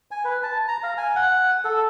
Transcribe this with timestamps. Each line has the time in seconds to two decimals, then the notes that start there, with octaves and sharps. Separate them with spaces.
0.11 G#5
0.25 B4
0.43 A5
0.68 A#5
0.83 F5
0.97 G#5
1.16 F#5
1.64 A4